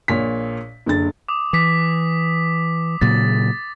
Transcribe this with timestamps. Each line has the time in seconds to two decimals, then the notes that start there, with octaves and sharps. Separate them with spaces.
0.08 A#1 A#2 C#5 B6
0.86 F#1 D3 A6
1.28 D6 D#6
1.53 E3 D6 B6
3.01 A#2 C#3 F#3 A6